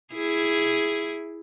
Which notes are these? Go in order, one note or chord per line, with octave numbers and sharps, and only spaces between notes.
E4 G#4